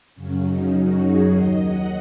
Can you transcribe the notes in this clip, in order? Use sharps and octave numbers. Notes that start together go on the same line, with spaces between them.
F#2 C#3 F#3 C#4
D#4
F#4
G#4
D#2 D#3 F#3 D#5
F#5